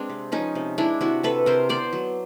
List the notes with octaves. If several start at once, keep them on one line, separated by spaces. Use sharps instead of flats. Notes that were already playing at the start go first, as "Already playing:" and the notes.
Already playing: G#3 C4 D4
C3
F3 C#4 D#4
C3
G#3 D4 E4
C3 E4 F#4
C3 A4 B4
C3 A#4 C5
B3 C5 D5
F#3